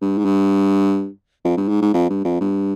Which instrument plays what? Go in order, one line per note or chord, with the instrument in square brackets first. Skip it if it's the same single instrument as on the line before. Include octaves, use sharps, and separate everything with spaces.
[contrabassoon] G2
G#2
G2
F2
G2
G#2
G#2
F2
G2
F2
G2